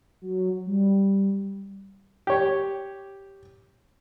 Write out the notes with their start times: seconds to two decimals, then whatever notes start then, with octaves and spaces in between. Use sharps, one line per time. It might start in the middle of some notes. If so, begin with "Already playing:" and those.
0.21 F#3
0.66 G3
2.27 G4 C#5